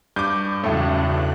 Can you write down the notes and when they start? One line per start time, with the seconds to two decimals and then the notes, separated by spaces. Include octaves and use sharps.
0.16 G2 D6 G6
0.64 B1 E2 A2 C#3 A3 F#6